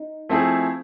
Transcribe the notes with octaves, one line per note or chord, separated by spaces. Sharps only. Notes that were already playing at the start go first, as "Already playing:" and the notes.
Already playing: D#4
F3 A3 C4 E4 G#4